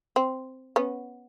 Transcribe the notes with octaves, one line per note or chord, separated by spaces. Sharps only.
C4
B3 C#4